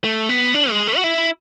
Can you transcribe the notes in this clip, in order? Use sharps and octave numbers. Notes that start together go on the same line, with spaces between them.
A3
B3
D4
G#3
A3
F#4
E4